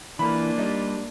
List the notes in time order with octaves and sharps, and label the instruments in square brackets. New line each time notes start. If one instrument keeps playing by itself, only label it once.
[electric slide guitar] E3 [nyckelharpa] A#3 F4 [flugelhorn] D4 [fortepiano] B5
[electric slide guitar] G3 [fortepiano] D#4